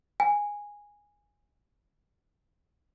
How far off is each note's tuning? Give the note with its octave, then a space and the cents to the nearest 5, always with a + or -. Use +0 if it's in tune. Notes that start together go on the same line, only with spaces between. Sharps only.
G#5 -10